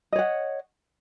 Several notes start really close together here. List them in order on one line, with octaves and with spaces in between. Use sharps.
D#5 C#5 F#5